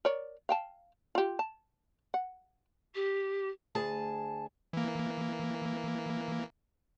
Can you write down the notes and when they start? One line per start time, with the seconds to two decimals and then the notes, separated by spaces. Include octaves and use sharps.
0.05 A#4 C#5 D5
0.49 F5 G5 A5
1.15 F4 G4
1.39 A5
2.14 F#5
2.94 G4
3.75 D2 G#4 A5
4.73 E3 A#3